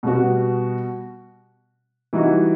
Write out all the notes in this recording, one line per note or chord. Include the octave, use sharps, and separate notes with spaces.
B2 G3 B3 F#4
E3 G3 D#4 F#4